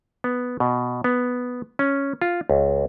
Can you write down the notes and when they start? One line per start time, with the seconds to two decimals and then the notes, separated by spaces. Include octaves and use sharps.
0.24 B3
0.60 B2
1.04 B3
1.79 C#4
2.22 F4
2.50 C#2